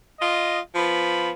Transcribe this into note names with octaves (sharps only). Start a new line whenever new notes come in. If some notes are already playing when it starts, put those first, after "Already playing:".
F4 D#5
F3 B3 B5